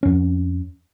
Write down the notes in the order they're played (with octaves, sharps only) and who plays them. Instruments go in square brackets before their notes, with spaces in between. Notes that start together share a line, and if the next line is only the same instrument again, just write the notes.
[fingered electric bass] F2 C#4